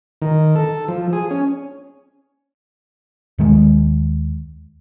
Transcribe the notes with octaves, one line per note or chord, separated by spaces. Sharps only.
D#3
A4
F3
G#4
C#4
D#2 D#3 G#3